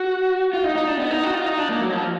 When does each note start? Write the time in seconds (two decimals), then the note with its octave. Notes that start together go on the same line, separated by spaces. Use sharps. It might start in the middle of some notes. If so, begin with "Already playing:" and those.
Already playing: F#4
0.53 F4
0.64 D#4
0.76 D#4
0.87 D4
0.99 B3
1.11 D#4
1.23 F#4
1.34 F4
1.46 D#4
1.58 D4
1.69 A#3
1.81 F#3
1.93 F3